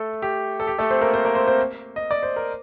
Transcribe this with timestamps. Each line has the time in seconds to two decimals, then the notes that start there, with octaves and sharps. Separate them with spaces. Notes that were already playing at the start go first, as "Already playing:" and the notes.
Already playing: A3 A4
0.22 G4
0.60 A4
0.67 G4
0.78 A3 A4
0.90 C4 C5
1.01 A#3 A#4
1.13 C4 C5
1.25 A#3 A#4
1.35 C4 C5
1.47 C4 C5
1.96 D#5
2.11 D5
2.23 C5
2.36 A#4